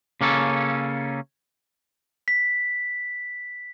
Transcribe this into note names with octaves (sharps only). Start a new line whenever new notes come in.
C#3 A#3 C#4 A4
B6